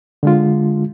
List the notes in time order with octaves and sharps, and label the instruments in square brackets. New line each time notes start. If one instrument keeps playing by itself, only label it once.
[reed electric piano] D3 G#3 F4